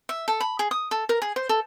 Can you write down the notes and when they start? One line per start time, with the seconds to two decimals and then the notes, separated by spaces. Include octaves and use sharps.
0.09 E5
0.28 A4
0.40 B5
0.59 G#4
0.71 D#6
0.91 A4
1.09 A#4
1.22 G#4
1.36 C5
1.49 A4